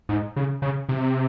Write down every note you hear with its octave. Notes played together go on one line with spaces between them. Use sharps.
G#2
C#3
C#3
C3